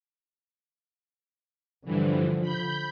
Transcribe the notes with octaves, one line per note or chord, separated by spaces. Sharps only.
G2 D3 E3 F3
B5 G6